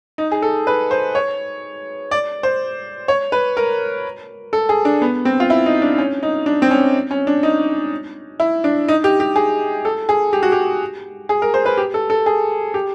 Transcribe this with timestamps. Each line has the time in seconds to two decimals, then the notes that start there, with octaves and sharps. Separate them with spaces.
0.18 D#4
0.32 G#4
0.42 A4
0.67 B4
0.91 C5
1.15 C#5
2.11 D5
2.43 C5
3.08 C#5
3.32 B4
3.57 A#4
4.53 A4
4.69 G#4
4.85 D4
5.02 B3
5.25 C4
5.40 F4
5.50 E4
5.66 D#4
5.82 D4
5.98 C#4
6.23 D#4
6.46 D4
6.62 C4
6.71 C#4
7.11 C#4
7.27 D4
7.43 D#4
8.40 E4
8.64 D4
8.88 D#4
9.04 G4
9.20 G4
9.36 G#4
9.85 A4
10.09 G#4
10.33 G4
10.43 F#4
10.52 G4
11.29 G#4
11.42 A#4
11.54 C5
11.66 B4
11.77 G4
11.94 A4
12.10 A4
12.26 G#4
12.74 G4